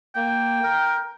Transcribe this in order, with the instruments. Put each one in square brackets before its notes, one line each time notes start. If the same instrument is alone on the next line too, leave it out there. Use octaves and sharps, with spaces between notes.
[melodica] A#3 [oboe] G5
[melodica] A#4